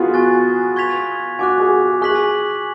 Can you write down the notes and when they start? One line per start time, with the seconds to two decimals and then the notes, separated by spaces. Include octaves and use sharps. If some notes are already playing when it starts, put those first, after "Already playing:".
Already playing: B3 F4 F#4 G#4
0.14 G#5 C#6 F#6 A6
0.76 C#6 G#6 B6 F7
1.39 F#4 G#5 D6 F#6
1.60 G#4
1.81 G#4
2.02 G#4 C#6 F#6 B6 F#7